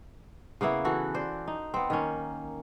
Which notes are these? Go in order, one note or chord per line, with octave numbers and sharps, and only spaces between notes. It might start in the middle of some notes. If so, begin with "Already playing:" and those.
C#3 A#3 B3 E4
E3 F#4 A4
C5 D5
D#4
B3 C4
D#3 A#3 C#4